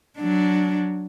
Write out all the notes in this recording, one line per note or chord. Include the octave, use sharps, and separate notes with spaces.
F#3 D4